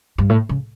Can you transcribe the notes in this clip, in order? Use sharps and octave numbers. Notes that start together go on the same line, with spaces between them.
G2
A2
C#3